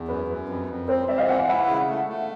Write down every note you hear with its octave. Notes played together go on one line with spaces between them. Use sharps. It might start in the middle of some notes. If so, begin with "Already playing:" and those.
Already playing: E2
F#2 B4
F#2
F2
F2
C4 A#4 C5
C4 D5 E5
D#5 F5
E3 F#5
F5
E4 E5 F#5
C#3
A3
A3